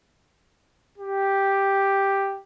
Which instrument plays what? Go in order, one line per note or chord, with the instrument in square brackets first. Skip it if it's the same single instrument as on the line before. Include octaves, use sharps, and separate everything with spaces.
[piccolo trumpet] G4